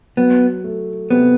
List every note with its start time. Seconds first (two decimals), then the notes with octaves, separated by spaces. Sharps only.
0.17 F#3 B3
0.64 A3
1.10 C3 B3